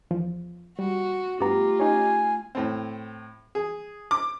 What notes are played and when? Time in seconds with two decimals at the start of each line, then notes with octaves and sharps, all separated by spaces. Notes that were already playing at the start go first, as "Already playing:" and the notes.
0.11 E2 F3
0.79 G3 F#4
1.40 G2 A3 B3 F4 G4 A#5
1.80 C#4 D#4 G#5
2.55 A2 C4
3.55 G#4
4.11 D6